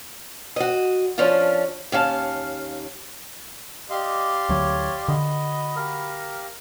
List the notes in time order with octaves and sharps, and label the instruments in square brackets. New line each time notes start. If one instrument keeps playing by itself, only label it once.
[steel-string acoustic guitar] F#4 D#5
F3 C#4 D4 F4
D#2 C#4 F5 A5
[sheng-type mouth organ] G4 F5 C6 [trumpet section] D5 [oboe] D#5
[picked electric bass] D2 F#3 [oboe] C#5
[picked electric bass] D3 [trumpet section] F#4 B5 [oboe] D#5
[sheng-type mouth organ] G4 F5 [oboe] A#4